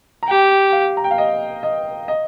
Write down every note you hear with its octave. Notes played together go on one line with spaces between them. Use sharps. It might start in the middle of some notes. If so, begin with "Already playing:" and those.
A#5
G4 G5
F5
A#5
G5
F5
D#5
D#5
D#5